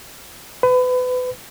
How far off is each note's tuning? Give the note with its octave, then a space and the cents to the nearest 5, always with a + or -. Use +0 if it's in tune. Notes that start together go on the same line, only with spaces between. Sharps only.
B4 +30